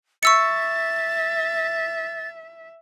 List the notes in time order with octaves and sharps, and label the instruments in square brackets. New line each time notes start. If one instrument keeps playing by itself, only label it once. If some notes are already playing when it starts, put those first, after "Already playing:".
[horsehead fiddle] E5 [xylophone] C#6 E6 C#7 [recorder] A6